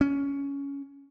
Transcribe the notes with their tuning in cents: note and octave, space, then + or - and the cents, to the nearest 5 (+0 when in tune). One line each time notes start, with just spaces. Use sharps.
C#4 +15